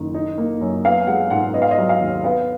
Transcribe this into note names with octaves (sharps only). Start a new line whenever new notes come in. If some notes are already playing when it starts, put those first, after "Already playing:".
Already playing: F#1 D#3
D#4
A#3
F#2
B3 F5
G#3 F#5
G#2 F#5
B3 D#5
F5
D#5
F#3
F5
D#2
B3 F5